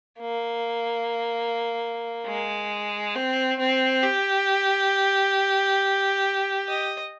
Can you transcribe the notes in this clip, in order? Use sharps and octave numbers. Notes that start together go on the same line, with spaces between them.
A#3
G#3
C4
C4
G4
D#5